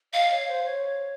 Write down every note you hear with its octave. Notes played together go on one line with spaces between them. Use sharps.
D#5 F5
C#5
C5
C#5